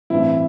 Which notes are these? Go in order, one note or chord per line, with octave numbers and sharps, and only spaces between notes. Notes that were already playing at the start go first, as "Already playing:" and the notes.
A1 G2 E3 C4 E4